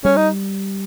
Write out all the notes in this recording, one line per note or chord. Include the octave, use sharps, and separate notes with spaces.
G3 C#4
D#4